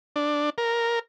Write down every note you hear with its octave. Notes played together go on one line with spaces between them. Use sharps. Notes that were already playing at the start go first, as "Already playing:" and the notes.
D4
A#4